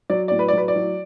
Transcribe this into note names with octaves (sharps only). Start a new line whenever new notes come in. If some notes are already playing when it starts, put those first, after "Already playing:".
F#3 D5
A2 D5
B4
D5
F#3 B4
D5
F#3